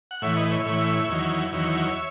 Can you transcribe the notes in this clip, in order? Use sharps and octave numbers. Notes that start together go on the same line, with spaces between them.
F#5
A2 E3 C#5 E5
B4 D#5
C#5 E5
A2 E3 C#5 E5
E2 D#3 F#3
E2 D#3 F#3 C#5 E5